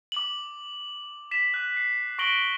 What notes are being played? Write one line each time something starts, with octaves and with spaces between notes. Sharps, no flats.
D6 F#7
B6 E7
F#6
C7
C#6 A#6 D7 F#7 G7